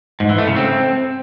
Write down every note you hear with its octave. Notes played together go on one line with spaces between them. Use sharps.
G#2
E3
A3
C#3
C4